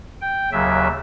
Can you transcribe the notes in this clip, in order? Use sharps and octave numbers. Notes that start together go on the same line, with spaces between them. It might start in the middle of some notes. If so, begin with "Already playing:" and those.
G5
D#2 C#3 F#3 E5